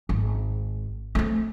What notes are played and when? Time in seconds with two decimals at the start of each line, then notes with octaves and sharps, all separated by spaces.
0.09 G#1
1.15 A3 C4